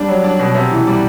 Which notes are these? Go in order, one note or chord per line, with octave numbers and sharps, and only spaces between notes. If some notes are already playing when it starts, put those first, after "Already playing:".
Already playing: G3 D4
F#3
D4 D5
B2
C3
E3
G3 D5